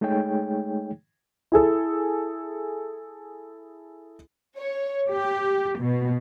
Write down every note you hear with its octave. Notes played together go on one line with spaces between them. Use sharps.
G#3 A3 D#4 G#4 C#5 G5
E4 G#4 A4
C#5
G4
B2